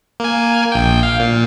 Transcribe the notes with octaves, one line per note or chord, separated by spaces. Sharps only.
A#3 G#5
A#1 G5
F5
A#2